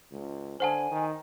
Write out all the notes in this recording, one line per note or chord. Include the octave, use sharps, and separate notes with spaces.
C#2
D3 C5 F#5 G#5 A5
D#3